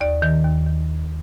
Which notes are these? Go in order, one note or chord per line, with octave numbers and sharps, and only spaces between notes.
D#2 D5
D#3
D#2
D#3